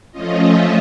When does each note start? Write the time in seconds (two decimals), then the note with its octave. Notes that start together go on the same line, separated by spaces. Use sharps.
0.12 F3 A3 C#4 F4 D#5
0.41 E5